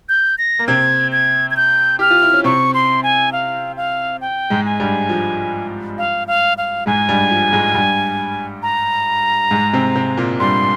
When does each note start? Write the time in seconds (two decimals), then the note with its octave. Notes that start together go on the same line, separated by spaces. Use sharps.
0.09 G6
0.38 A#6
0.59 A#3
0.68 C3 C4 G#6
1.12 G#6
1.51 G#6
1.56 G6
1.99 G4 F6
2.10 F4
2.22 E4
2.34 C#4
2.44 C3 C4 C#6
2.74 C6
3.03 G#5
3.32 F5
3.77 F5
4.21 G5
4.50 G#2 G#3
4.65 G#5
4.80 G2 G3
5.09 F3
5.98 F5
6.28 F5
6.58 F5
6.86 G#2 G#3 G#5
7.08 G2 G3
7.30 F3
7.53 G#2 G#3
7.74 G2 G3
8.63 A#5
9.51 G#2 G#3
9.73 C3 C4
9.95 C3 C4
10.17 A#2 A#3
10.40 G2 G3 C6